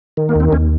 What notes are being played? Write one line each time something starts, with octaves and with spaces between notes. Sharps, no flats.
D#3
A#3
D#2 C4
D#2 C#4